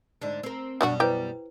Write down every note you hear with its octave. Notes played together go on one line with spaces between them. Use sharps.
G#2 D3 D4
C4 A#4
F#2 B2 F#3 G3 D4 F#4
E4 G4 B4 C5